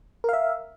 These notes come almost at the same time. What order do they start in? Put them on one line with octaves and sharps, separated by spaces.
A#4 F5 E5